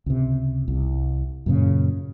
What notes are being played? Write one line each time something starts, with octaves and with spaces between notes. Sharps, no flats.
C#2 C3
C2
F#2 A#2 C#3